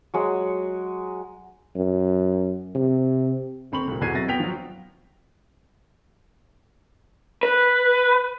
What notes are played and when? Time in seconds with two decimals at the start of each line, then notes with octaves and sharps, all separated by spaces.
0.14 F#3 G#3 F#5
1.75 F#2
2.75 C3
3.72 D#1 C4 B5 C#6 F#7
3.88 C2 A#2
4.01 B1 E2 F#4 G#6 C7 D#7
4.14 C3 F#3 E4 A6 A#6
4.28 F#3 B3 G5 B6 F7
4.40 F3 F#3
7.43 B4